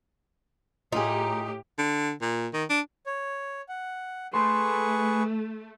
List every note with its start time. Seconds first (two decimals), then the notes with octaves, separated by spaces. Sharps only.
0.92 A2 D#4 F4 G4 G#4
1.79 D3
2.22 A#2
2.53 D#3
2.70 D4
3.06 C#5
3.69 F#5
4.33 A3 G#4 B4 C6 C#6